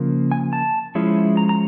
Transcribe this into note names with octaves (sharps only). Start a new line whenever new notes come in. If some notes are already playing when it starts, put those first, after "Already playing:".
Already playing: C#3 F3 A#3
G#5
A5
F3 G#3 C#4 E4
A#5
A#5